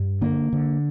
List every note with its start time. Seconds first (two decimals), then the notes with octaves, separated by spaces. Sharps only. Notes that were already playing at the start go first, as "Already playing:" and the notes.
Already playing: G2
0.21 D3 A#3
0.53 D3